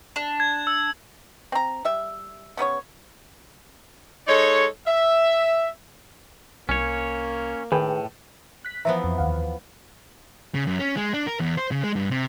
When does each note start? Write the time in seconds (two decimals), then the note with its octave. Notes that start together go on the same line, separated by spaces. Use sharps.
0.16 D4
0.40 G#6
0.67 E6
1.52 C4 A#5
1.85 G3 E5
2.57 C#3 B3 E4 C#5
4.28 G#3 D#4 A4 C#5
4.87 E5
6.69 C2 A#3 C#4 C#5
7.72 A2 D#3 G#4 B4 G5
8.65 F#6 B6
8.85 E3 F3 B3 E5 A#5
9.04 F2
9.18 D#2 F5 F#5
10.55 C#3
10.67 F#2
10.79 C#4
10.97 G#3
11.14 D4
11.27 A#4
11.40 E2
11.57 C5
11.72 C#3
11.84 G#3
11.96 G2
12.10 C3